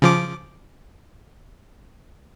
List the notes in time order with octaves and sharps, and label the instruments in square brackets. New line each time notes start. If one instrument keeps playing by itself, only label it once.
[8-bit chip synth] C#3 F3 D6